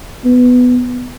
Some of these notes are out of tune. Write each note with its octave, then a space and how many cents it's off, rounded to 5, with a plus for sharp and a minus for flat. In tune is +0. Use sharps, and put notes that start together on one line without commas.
B3 +10